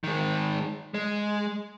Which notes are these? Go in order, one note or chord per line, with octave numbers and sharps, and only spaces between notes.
D#3 G#3
G#3